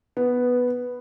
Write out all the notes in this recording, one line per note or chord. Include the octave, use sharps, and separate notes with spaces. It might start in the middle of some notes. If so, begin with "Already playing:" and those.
B3